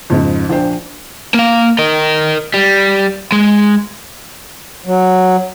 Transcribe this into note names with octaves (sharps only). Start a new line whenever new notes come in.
F2 G#2 C#3
A#1 D4 C5 G5
A#3 F5
A#4 D#5
G3
G#3
F#3